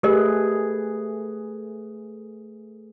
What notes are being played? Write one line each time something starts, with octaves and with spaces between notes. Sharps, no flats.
A3 G4 G#4 A#4 B4 D#5